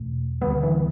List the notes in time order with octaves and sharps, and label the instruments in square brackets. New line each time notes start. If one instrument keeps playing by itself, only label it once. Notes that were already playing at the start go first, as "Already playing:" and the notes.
Already playing: [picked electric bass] E2 B2 A3
[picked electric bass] D2 D3 G3 [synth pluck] B3
[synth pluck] E3